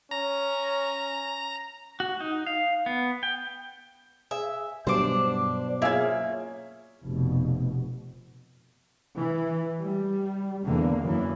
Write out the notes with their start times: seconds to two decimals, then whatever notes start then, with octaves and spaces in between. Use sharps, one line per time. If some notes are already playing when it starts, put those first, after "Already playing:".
0.11 C#4 A#5
2.00 F#4
2.20 D#4
2.47 F5
2.86 B3
3.23 G5
4.31 G#4 E5
4.87 G2 B2 F#3 D4 C5 D6
5.82 A#3 C#4 F4 G#4 E5 G#6
7.04 F1 B2
9.18 E3
9.82 G3
10.66 E2 D3 A#3
11.03 F#2 E3